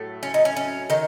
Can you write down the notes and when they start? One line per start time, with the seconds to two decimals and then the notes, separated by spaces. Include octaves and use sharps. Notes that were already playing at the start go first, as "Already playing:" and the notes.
Already playing: A2 F#3 A3
0.23 C#4
0.34 D#4
0.45 C#4
0.57 C#4
0.90 D#3 D#4